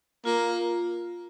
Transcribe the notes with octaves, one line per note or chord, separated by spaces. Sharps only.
A#3 F4